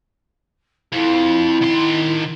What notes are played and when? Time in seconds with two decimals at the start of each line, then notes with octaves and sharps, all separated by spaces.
0.92 F2 E4
1.61 D#3 C6